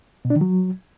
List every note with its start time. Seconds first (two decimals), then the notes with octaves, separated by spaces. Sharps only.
0.25 B2
0.30 D4
0.36 D#3
0.41 F#3